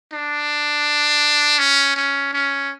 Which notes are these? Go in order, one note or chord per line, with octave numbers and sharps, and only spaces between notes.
D4
C#4
C#4
C#4